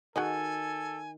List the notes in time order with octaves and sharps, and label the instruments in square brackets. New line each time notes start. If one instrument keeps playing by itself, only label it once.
[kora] D#3 [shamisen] F#4 G#4 D#5 [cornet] A4 [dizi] G#5